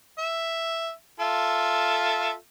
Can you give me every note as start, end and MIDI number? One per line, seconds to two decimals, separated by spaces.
0.18 0.91 76
1.20 2.33 65
1.20 2.33 69
1.20 2.33 76